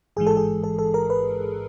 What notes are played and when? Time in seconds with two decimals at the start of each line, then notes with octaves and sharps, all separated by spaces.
0.17 A1 G#2 E3 G#3 G#4
0.27 A4
0.37 G#4
0.64 A4
0.79 A4
0.94 A#4
1.10 B4